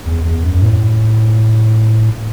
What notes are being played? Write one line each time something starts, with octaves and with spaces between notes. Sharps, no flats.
E2
E2
F#2
A2